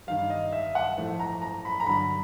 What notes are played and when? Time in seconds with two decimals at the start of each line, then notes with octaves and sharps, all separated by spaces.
0.07 G2 D#3 G3 F5
0.30 D#5
0.53 E5
0.75 F#5
0.97 A2 F3 A3
1.20 A#5
1.42 A#5
1.65 B5
1.80 A#5
1.86 G2 D3 F#3 B5